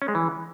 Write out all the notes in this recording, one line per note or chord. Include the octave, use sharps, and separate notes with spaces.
C#4
G#3
E3